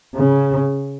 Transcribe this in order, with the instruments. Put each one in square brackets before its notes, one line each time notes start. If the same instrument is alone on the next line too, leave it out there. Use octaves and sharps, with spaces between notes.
[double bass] C#3